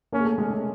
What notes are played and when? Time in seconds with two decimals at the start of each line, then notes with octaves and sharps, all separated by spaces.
0.12 A#3 C#4 A#4
0.20 G#4
0.25 A3 A4
0.38 G#3 G#4
0.50 A3 A4